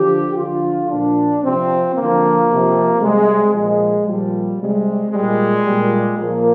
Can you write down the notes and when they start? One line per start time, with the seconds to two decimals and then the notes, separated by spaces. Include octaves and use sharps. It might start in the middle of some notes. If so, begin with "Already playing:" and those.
Already playing: D3 F3 G4
0.36 D3 F3 F4
0.89 A#2 F3 D4
1.42 C3 F3 C4
1.95 D3 F3 A#3
2.47 C3 F3
3.00 C3 G3 G#3
3.53 A#2 F3 G#3
4.06 A#2 F3 G3
4.59 C3 G3 G#3
5.11 A#2 G3 G#3
5.64 A#2 G3
6.17 A#2 F3 A#3